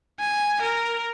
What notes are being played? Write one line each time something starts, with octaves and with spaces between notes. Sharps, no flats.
G#5
A#4